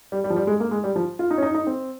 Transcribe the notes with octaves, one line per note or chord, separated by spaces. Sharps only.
G3
G3
F3
G3
G#3
A#3
G#3
G3
F3
F4
D#4
C#4
D#4
D#4
C4